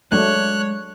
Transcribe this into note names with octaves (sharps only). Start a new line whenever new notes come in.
F#3 G#3 A3 D4 C#5 F#6